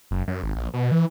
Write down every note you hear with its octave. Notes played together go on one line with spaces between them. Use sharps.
F#1
F#2
G#1
A#1
B2
E3